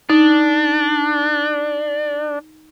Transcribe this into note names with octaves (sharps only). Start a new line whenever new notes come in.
D4 D#4